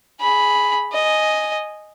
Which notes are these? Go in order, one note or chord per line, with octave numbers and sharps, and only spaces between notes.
G#4 B5
D#5 G#5